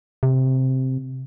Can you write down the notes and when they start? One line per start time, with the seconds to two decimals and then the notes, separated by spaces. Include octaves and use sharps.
0.23 C3